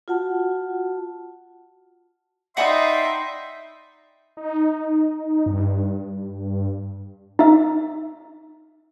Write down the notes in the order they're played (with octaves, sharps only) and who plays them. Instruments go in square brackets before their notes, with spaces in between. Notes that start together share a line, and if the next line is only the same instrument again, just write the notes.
[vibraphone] F4 F#4 F#5 A5
[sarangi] D#4 [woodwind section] D5 G5 C6 [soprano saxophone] E5 [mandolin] F#5 B5 D#6
[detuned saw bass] D#4
G2
[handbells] D#4 E5